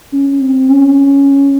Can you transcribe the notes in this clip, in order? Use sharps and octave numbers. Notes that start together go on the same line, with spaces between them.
C#4
C4
C#4